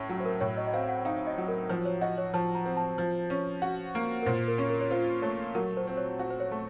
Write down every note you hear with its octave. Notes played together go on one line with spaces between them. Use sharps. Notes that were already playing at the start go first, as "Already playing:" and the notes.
Already playing: A2 A3 C#4
F#3
C5
A#4
A2 C#5
D#5
D#5
C4 F5
F#5
D#4 F5
D#5
F#3
A#4
F3 C5
C#5
F#4 D#5
C#5
F3 A5
A#5
C4
A5
F3
C#4
F#4
A#3
A#4
A#2 C5
A#4
C#4
A#4
C#5
F4 C5
A3 C#5
F#3 A#4
C5
C4
C#5
F#4
C5
C#5
A3